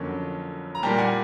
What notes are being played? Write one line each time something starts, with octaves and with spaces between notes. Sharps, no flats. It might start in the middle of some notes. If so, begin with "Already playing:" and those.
Already playing: F2 D3 F#3 A#3 C#4
A#5
A#2 G3 A#3 G5 A5
F#5 G#5